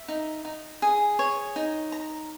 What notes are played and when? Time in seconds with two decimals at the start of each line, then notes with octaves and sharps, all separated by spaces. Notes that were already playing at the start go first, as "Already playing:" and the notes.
Already playing: E5
0.08 D#4
0.45 D#4
0.82 G#4
1.19 C#5
1.56 D#4
1.92 A#5